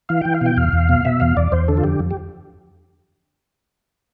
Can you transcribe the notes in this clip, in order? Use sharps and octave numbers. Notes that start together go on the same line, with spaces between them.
E3 F5
E3 G5
F5
B2 G5
E2 F5
E2
B2
B2 E5
E2 F5
E2 D5
E2 C5
D3 A4
F4
F2 G4
F2
G4